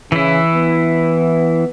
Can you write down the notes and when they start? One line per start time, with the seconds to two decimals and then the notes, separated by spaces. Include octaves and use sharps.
0.12 C#3 E3 E4
0.54 B3